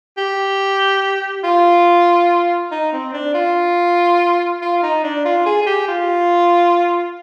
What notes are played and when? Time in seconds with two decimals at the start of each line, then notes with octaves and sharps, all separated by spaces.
0.18 G4
1.44 F4
2.72 D#4
2.93 C4
3.13 D4
3.34 F4
4.62 F4
4.83 D#4
5.04 D4
5.25 F4
5.46 G#4
5.62 G#4
5.67 G4
5.88 F4